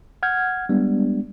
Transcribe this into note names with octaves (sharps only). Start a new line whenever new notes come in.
F#5 F6 G6 G#6
G3 G#3 B3 D4